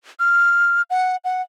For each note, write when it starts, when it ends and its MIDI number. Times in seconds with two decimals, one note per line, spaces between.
0.20 0.82 89
0.90 1.17 78
1.24 1.42 78